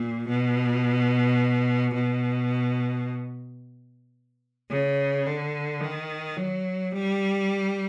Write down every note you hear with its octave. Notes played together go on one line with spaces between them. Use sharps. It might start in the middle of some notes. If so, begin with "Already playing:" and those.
Already playing: A#2
B2
B2
C#3
D3
D#3
F#3
G3